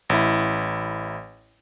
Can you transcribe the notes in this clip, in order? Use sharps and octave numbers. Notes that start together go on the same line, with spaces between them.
A1 E4